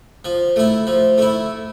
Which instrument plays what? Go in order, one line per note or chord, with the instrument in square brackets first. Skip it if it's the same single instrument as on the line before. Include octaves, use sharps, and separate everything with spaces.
[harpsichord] F3
A3 E4
F3
A3 E4